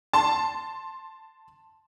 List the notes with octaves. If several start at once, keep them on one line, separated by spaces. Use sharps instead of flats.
A5 C6